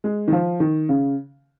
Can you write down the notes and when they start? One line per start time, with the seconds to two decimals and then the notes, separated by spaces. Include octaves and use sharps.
0.04 G#3
0.28 D#3
0.32 F3
0.60 D#3
0.89 C#3